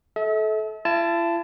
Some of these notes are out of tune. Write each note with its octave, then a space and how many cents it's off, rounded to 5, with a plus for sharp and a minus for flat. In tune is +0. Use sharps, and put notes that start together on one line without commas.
A4 -25 E5 -40
E4 +45 A5 +0